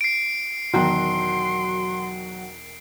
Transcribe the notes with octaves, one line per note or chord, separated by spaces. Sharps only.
C7 D7
E1 D#3 F#3 F#4 G5 C6